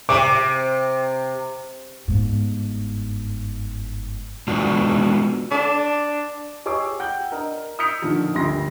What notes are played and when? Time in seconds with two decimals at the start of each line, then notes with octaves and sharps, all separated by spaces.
0.09 C3 D6
2.08 G1 G#2
4.48 G#3 B3 D4 F4 F#4
5.51 D4
6.65 G4 G#4 C#5 C#6 D6 E6
7.00 F#5 G5 G6
7.31 D4 A#4 D#5
7.79 D#6 E6 G6 B6 C#7 F7
8.02 A#2 D3 D#3 F3
8.34 G1 D2 G4 C6 A#6